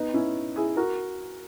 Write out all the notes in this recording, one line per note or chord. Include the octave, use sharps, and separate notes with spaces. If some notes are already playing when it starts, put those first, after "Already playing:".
Already playing: B3 D#4
C#4 E4
E4 G#4
F#4 A#4